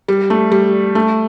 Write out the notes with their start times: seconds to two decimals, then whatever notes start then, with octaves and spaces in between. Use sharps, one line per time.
0.08 G3
0.30 A3
0.52 G3
0.95 A3